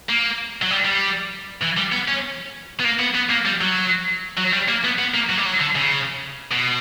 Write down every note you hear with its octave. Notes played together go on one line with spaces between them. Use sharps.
A#3
F#3
G3
G3
E3
G3
B3
C#4
B3
A#3
B3
B3
A#3
G3
F#3
F#3
G3
A#3
B3
B3
A#3
F#3
G3
F#3
D3
C#3
B2